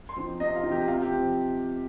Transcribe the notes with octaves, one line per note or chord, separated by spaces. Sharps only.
C6
F3 C4 D#4
C3 D#5
F4
F3 C4 D#4
G4
C3 F4
G4
F3 C4